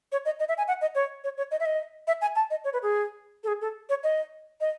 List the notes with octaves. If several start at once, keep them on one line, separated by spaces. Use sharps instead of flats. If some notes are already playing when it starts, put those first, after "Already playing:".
C#5
D#5
D#5
E5
G#5
F#5
D#5
C#5
C#5
C#5
D#5
E5
D#5
E5
G#5
A5
D#5
C#5
B4
G#4
A4
G#4
A4
C#5
D#5
D#5